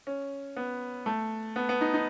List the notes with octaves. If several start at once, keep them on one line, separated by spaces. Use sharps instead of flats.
C#4
B3
A3
B3
B3
D#4
D#4